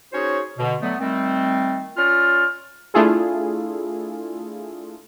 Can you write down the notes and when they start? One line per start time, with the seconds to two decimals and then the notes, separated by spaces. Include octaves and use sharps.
0.13 C#4 D#4 F#4 G#4 C5 C#5
0.58 B2 D3
0.82 D3 F#3 A3 B3
1.00 D#3 G3 A3 C4
1.97 C#4 F4 D5 F6
2.94 A3 D4 E4 F4 G#4 A4